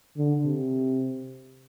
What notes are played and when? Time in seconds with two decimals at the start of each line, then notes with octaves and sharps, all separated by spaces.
0.17 D3
0.45 C3